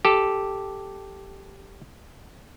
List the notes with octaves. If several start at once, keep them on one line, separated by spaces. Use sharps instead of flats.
G4 A4